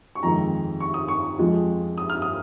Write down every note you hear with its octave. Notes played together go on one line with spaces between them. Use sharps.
C#6
F2 D#3 G#3 A#5
C#6
D#6
C#6
F2 F3 G#3
D#6
F6
D#6